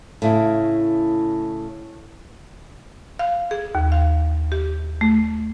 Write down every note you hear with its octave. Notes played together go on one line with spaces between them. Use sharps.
A2 C#3 E4
F5
G#4
D#2
F5
G4
A3